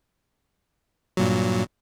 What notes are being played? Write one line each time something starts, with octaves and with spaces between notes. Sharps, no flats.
G2 A#2 F#3